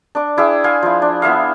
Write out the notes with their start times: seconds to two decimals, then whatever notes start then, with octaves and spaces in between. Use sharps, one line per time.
0.15 D4 D6
0.37 D4 E4 G#4 G5
0.64 G#4 F5 G#5 C6
0.83 F3 E4
1.02 D4
1.22 B3 E4 E5 F5